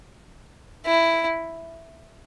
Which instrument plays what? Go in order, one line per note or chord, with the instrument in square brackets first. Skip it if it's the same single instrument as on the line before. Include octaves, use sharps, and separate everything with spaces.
[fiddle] E4